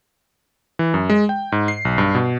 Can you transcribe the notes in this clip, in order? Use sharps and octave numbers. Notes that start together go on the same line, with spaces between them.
E3
F#2
G#3
G5
G#2
C7
B1
G2
B2